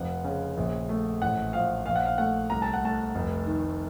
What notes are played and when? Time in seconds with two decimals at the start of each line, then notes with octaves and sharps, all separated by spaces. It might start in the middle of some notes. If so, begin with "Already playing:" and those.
Already playing: F1 F3 F#5
0.24 C#3
0.57 A#1
0.89 A3
1.21 A1 F#5
1.53 F3 F5
1.86 A#1 F5
1.96 F#5
2.05 F5
2.18 A3 F#5
2.50 C2 A#5
2.62 A5
2.73 F#5
2.83 A3 A5
3.15 F1
3.46 D#3